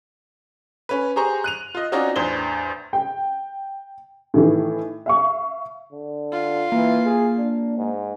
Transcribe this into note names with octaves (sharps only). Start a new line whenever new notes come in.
C#4 B4
G4 G#4 C5 A#5 C#6
F#6 D#7 F7
F4 D#5
C4 C#4 D#4 F4 F#4 D5
A1 E2 D4 C5 G7
G5
A2 D#3 E3
E5 F5 C#6
D3
F4
E3 A#3
G#4
D4
G#2